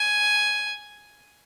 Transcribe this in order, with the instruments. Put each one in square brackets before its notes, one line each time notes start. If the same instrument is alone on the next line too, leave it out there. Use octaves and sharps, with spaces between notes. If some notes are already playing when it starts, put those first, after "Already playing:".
Already playing: [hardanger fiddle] G#5